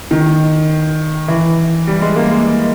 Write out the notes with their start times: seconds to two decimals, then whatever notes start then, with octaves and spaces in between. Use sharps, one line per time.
0.11 D#3
1.28 E3
1.87 G3
2.01 G#3
2.16 A#3
2.31 G#3